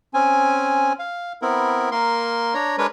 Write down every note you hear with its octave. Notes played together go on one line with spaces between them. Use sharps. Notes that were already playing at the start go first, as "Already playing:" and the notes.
C4 C#4 G#5
F5
B3 C4 E4 A#4
A#3 A#4 C6
D4 C#5 A#5
G#3 D4 A#4 B4 C#5